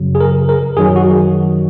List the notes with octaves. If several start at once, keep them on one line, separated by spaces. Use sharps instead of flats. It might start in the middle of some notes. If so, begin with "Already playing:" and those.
Already playing: F#2 C#3 F#3
G#4
A#4
A#4
F#2 D#3 F#3 G#4
F#4